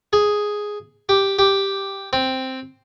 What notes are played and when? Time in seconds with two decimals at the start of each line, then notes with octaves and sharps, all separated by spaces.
0.13 G#4
1.09 G4
1.39 G4
2.13 C4